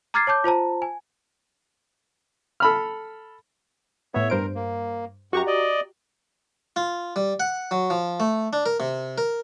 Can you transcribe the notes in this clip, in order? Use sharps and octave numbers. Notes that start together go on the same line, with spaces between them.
A#5 D6 F6 G#6 A6 C7
C#5 A5 D6 G6
F4 C5 A5 A#5
G#5
A4 B5 F6
A2 B3 C#5 E5
G2 A#4 C5 D7
A#3
F#2 F#4 G4 A#5 C#6
D5 D#5
F4
G3
F#5
F#3
F3
A3
D4
A#4
C3
A#4